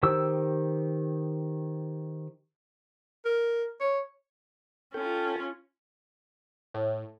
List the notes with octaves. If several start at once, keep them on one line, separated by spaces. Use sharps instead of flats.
D#3 G4 C5 E6
A#4
C#5
C#4 F4 A4 G5
A2